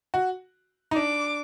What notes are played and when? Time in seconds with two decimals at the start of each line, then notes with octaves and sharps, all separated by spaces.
0.14 F#4
0.91 D#4
0.96 D4 D6